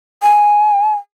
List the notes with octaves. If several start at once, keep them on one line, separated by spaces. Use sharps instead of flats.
G#5